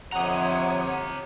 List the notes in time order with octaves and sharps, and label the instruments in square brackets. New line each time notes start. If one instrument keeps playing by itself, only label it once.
[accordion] F2 C3 [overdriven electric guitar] G4 A#5 [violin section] C#5 [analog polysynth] F#5 D#6